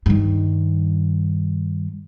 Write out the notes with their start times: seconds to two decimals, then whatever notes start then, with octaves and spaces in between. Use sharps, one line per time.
0.06 G2 D#3